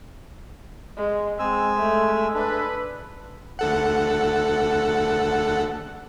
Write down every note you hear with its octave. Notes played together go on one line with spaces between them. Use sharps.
G#3
G#3 C4 G#5 E6
A3
D4 A4 B4
D2 A4 F#5